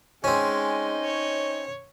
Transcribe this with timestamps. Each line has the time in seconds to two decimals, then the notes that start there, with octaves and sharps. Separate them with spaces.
0.24 G#3 C4 C#4 D#4
1.04 C#5